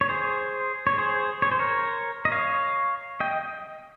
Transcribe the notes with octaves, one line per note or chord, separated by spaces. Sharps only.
C#5
G#4 C5
C#5
G#4 C5
C#5
C5
A#4 C#5
D#5
C#5 F5
D#5 G5